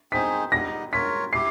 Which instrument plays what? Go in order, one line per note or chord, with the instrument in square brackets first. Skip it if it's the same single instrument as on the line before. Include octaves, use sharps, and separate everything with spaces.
[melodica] C4 D#4 G#4 C5 [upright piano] B6
[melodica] G3 B3 D#4 [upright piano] A#6
[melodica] F4 A#4 C#5 [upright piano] B6
[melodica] E4 G4 [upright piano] C7